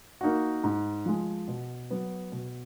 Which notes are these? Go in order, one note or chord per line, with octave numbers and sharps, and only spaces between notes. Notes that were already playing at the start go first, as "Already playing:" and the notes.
A#3 D#4 F#4
G#2
F3 G#3
B2
F#3 B3
B2